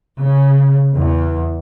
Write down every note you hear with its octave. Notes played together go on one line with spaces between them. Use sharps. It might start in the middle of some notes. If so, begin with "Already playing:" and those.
C#3
E2